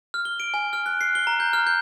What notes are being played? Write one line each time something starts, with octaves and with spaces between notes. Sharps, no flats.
F6
G7
D7
G#5
F6
F#6
C7
G7
A#5
G6
F6
G6